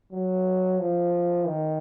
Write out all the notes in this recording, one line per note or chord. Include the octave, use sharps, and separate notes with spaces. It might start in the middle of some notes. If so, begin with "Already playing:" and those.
F#3
F3
D#3